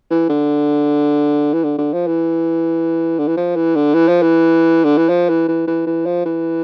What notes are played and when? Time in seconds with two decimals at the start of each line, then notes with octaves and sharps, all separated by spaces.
0.10 E3
0.29 D3
1.54 E3
1.64 D3
1.78 D3
1.93 F3
2.07 E3
3.19 D3
3.28 E3
3.37 F3
3.56 E3
3.76 D3
3.94 E3
4.08 F3
4.22 E3
4.85 D3
4.97 E3
5.09 F3
5.29 E3
5.48 E3
5.67 E3
5.87 E3
6.06 F3
6.25 E3